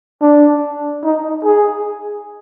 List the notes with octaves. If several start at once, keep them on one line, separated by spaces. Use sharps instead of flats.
D4
D#4
G#4